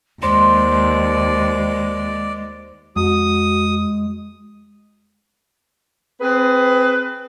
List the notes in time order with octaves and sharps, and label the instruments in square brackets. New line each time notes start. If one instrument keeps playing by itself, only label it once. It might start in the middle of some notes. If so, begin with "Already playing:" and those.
[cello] D#2 [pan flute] G#3 [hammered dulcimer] C5 [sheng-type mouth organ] D5
[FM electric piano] F2 [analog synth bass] G#3 [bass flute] F#4 [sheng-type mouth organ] D#6
[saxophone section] C4 G#4 B4